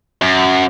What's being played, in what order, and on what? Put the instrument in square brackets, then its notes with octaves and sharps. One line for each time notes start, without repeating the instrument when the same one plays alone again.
[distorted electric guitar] F#2